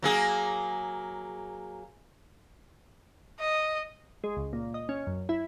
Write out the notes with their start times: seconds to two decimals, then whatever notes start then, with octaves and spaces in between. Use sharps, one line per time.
0.03 F#3 A#3 G#4
3.40 D#5
4.24 G#3
4.37 C#2
4.53 A#2
4.74 D#5
4.89 C#4
5.07 F#2
5.29 E4